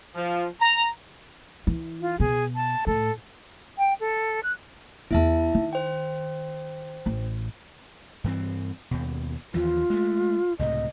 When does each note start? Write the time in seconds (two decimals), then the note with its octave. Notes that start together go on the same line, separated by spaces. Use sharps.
0.15 F3
0.60 A#5
1.67 E3
2.01 F4
2.20 B2 G#4
2.55 A5
2.87 A2 A4
3.77 G5
4.00 A4
4.43 F#6
5.11 E2 B3 E4 E5 A5
5.54 D#3
5.73 C5 G5
7.06 A1
8.24 G2 E3 C4
8.91 D#2 B2
9.54 D#2 E3 F3 F4
9.90 G#3 A3
10.59 C#2 A2 C3 D#5